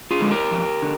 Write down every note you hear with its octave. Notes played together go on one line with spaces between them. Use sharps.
F4 G#4
D3 G#3
G4 A#4
F2
D3